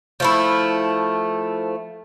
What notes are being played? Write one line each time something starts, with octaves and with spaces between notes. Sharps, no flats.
F3 A3 E4